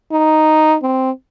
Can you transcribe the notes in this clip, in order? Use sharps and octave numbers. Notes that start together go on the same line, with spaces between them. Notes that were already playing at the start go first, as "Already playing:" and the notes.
D#4
C4